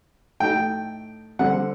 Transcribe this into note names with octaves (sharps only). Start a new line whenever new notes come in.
A2 A3 D#4 G5
D3 G3 C4 F#5